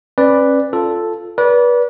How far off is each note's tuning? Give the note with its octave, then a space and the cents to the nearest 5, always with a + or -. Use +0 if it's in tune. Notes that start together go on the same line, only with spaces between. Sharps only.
C#4 -35 B4 +0 D5 +0
F4 +0 A4 +0
B4 -30 D5 -30